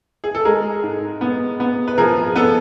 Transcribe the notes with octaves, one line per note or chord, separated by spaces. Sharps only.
G#4
A4
G#3 G#4 A#4
G#2
B3
B3
B4
F3 G#4 A#4
B3 A4 B4